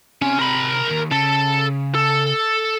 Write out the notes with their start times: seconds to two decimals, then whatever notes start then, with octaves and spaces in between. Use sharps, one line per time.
0.22 C3 C#4
0.39 A#4 B5
0.91 D#2
1.12 C#3 A4
1.95 A4